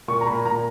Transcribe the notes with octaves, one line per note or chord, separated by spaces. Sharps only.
A#2 C#6
A#5
A#2 B5
A#2 A#5